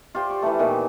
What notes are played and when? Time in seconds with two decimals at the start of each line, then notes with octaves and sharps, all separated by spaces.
0.15 F4 G4 C5 D5
0.30 C#6
0.42 E3 F3 A3
0.59 A#2 D#3 E3 B3